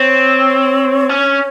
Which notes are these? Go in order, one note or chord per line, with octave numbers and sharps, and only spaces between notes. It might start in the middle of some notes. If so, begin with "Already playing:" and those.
Already playing: C4 C#5
C#4